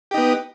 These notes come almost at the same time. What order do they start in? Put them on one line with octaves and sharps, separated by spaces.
G4 D#4 B3